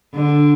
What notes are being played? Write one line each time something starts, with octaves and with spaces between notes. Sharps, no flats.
D3